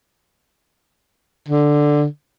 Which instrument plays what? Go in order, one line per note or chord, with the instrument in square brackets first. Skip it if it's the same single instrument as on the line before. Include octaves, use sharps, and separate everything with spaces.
[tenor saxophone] D3